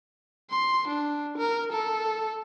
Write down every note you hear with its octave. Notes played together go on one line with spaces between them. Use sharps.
C6
D4
A#4
A4